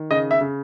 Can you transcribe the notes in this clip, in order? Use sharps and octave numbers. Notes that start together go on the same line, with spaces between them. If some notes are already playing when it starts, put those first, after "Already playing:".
Already playing: D#3
C#3 D#5
E5
C#3